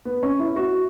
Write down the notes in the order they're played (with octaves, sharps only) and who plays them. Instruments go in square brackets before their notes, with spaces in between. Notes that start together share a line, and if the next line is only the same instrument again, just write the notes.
[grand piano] B3
C#4
E4
F#4